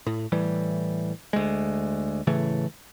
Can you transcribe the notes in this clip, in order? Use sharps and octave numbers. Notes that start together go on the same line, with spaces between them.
A2
A2 E3 G3
D2 G#3
A2 C#3 E3 A3